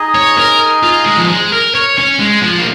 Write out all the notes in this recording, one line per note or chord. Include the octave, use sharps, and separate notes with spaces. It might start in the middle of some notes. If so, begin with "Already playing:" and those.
Already playing: D#4 G#4 D#5 G#5
C#5
A#4
F4
G#3
F3
G#3
A#4
C#5
C#4
G#3
F3
A#3